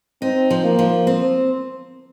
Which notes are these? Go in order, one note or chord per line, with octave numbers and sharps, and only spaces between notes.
C4 D#4
F3
A#3
F3
C4